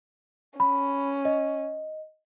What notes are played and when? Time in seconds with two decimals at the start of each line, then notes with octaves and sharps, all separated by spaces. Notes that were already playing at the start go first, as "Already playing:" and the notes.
0.60 C#4 B5
1.25 D#5